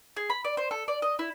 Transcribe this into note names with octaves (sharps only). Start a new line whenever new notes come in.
G#4
B5
D5
C5
A4
D5
D#5
E4